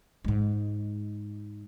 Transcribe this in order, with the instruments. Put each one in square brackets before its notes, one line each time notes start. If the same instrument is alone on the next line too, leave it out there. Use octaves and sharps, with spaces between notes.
[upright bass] G#2 G#3